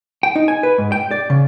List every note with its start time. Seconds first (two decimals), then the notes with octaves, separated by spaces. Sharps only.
0.23 G5
0.36 D#4
0.48 G#5
0.63 B4
0.78 G#2
0.92 G5
1.11 D5
1.30 C#3